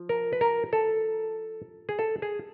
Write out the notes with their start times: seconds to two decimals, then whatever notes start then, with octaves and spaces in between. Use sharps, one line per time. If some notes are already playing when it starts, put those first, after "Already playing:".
Already playing: F3
0.09 A#4
0.33 B4
0.41 A#4
0.73 A4
1.89 G#4
1.99 A4
2.22 G#4